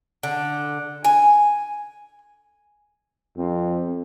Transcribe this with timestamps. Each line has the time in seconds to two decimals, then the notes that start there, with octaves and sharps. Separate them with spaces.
0.23 D3
1.05 G#5
3.37 F2 C4